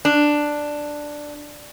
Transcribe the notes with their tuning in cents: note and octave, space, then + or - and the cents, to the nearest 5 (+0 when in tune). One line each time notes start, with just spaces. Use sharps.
D4 +5